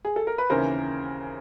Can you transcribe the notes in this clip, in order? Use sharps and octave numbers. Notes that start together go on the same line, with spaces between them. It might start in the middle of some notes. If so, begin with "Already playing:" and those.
G#4
A4
A#4
B4
D#2 C#3 E3 A#4 C5